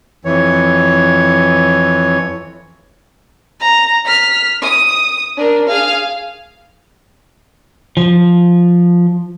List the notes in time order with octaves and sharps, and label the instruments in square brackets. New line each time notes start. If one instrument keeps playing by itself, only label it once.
[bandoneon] F2 E3 C#5
[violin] A#5
F6 B6
D#6
D4 A#4
G#4 F5
[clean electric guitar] F3